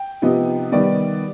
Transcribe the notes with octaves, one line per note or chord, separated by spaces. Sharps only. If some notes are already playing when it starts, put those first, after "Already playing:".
Already playing: G5
C3 F3 B3 D#4
D#3 G3 B3 D5